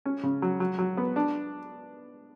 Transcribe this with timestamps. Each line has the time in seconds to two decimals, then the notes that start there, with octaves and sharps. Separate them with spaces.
0.06 C#4
0.23 C#3
0.42 F#3
0.60 F#3
0.79 F#3
0.97 B3
1.16 D4